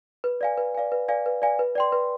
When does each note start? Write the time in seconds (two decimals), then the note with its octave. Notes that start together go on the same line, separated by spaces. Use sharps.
0.24 B4
0.41 D5 F5 G#5
0.58 B4
0.75 D5 F5 G#5
0.92 B4
1.09 D5 F5 G#5
1.26 B4
1.42 D5 F5 G#5
1.59 B4
1.75 D5 G5 C6
1.92 B4